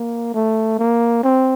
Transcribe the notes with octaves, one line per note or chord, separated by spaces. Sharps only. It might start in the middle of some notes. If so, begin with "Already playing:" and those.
Already playing: A#3
A3
A#3
C4